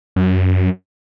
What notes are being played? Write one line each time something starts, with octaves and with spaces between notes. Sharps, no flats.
F#2